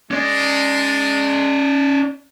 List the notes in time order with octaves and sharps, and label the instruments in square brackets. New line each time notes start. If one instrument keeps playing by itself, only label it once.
[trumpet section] G#3 [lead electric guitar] C#4 D5